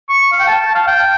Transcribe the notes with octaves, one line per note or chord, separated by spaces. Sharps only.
C#6
F5
G5
A5
F5
G5